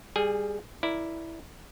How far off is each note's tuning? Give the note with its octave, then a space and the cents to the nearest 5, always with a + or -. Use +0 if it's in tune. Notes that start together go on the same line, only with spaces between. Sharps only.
G3 +20 G#4 +0 G#5 -25
E4 +0 A#4 +15 D5 +0